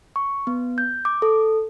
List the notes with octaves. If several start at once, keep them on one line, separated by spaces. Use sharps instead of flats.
C#6
B3
G6
D6
A4